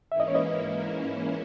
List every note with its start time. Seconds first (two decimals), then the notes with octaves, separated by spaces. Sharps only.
0.11 G#2 E3 A#3 C#4 E4 E5
0.20 D#5
0.28 C#5
0.35 B4 D#5